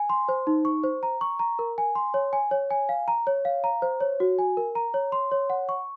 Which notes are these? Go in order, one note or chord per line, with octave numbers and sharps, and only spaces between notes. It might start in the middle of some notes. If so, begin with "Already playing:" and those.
Already playing: G#5
C6
C5
D#4
C#6
C5
A#5
C#6
A#5
A#4
G#5
C6
C#5
G#5
C#5
G#5
F5
A#5
C#5
F5
A#5
C5
C#5
F#4
G#5
A#4
A#5
C#5
C6
C#5
F#5
C#6